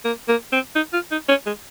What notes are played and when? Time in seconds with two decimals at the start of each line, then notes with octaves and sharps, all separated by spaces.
0.05 A#3
0.28 A#3
0.52 C4
0.76 D#4
0.93 F4
1.11 D#4
1.29 C#4
1.46 G#3